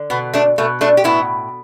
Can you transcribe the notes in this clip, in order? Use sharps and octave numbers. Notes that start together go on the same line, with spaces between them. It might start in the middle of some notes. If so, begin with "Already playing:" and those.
Already playing: D3
B2 B3
A3 D4
B2 A3
A3 D4
G4
A2 B3 E4